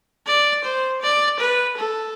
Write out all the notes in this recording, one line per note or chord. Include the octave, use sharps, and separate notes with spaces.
D5
C5
D5
B4
A4